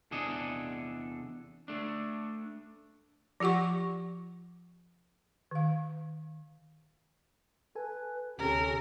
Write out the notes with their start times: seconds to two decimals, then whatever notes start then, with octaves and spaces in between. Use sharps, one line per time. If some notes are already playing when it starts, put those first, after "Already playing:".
0.11 E2 C3 D4 G#4 A4 D#5
1.68 A3 D4
3.40 F3 F4 G4 F#5 C#6
5.51 D#3 F5
7.75 A4 B4 G#5
8.38 D2 C3 C#4 G4 A4 A#4